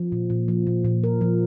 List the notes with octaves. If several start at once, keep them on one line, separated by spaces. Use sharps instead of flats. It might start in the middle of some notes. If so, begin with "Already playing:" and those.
Already playing: F3
A#2
A#2
F3
A#2
A#2
A#4
F3